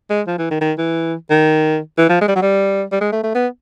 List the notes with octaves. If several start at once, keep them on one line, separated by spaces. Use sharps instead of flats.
G#3
F3
E3
D#3
D#3
E3
D#3
E3
F3
G#3
G3
F#3
G3
G3
G#3
A3
A3
B3